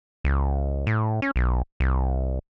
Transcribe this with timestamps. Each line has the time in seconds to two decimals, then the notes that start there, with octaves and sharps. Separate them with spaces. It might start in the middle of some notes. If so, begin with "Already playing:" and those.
0.24 C#2
0.87 A2
1.22 C#4
1.36 B1
1.80 C2